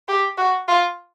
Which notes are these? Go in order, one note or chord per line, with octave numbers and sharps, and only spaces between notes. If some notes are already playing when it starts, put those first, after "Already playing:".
G4
F#4
F4